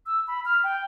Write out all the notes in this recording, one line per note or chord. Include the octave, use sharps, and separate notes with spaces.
E6
B5
F6
G5